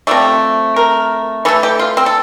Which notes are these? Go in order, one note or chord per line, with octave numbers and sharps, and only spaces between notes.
C3 F3 A3 D5
A#4
E3 A3 A4
G4
F4
C4
A4